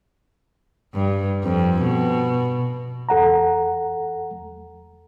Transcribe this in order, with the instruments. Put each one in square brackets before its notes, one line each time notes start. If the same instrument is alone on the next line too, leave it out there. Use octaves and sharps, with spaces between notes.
[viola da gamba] G2
F2
B2
[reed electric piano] E2 A4 F#5 A#5